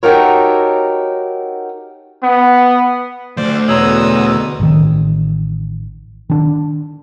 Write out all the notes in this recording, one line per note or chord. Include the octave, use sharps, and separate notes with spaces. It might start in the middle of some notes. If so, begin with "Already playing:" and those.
D#4 F#4 G4 A4 A#4 C#5
B3
D2 C5 D5
E2 B2 C#5 A#5 C6 D#6 E6
A1 D#3
D#3 D4